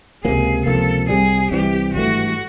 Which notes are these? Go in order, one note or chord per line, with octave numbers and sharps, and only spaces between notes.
C#2 C3 F3 A#3 G#4
C#2 C3 F3 A#3 A4
C2 C3 E3 G3 G#4
C2 C3 E3 G3 G4
G#1 G2 E3 A3 F#4